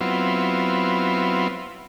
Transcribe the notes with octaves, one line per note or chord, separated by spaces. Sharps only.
F#3 B3 C4 E4 F4